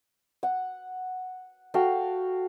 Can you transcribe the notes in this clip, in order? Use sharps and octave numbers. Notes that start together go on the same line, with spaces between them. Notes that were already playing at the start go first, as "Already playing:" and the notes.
F#5
F#4 A4 F5 G5